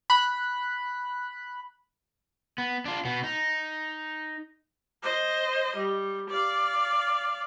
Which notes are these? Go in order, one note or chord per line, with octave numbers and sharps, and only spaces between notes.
B5 F#6
B3
D4 F4
B2 B3
D#4
C5 D#5
G3
D5 F5